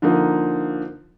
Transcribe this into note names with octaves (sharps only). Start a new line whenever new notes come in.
D3 F3 A#3 D#4